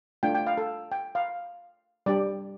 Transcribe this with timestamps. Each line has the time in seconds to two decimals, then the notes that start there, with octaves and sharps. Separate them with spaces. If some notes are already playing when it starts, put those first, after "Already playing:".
0.23 A3 D4 F4 G5
0.35 G5
0.46 F5
0.57 A4
0.92 G5
1.15 F5
2.06 G3 D4 G4 D5